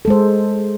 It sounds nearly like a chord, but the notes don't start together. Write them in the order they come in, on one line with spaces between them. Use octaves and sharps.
A4 G#3 C5